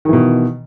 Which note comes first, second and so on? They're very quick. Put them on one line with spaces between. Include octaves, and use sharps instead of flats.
D#3 E3 B2